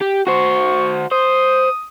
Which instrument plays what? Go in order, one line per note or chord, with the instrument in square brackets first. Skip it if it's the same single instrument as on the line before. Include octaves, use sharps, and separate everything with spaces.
[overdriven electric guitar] G4
[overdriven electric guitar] F#4 C5 [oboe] C#6
[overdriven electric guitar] C5 [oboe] D#6